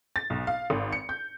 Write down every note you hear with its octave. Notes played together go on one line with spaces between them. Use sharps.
A6
B1
F5
G#1
C#7
G6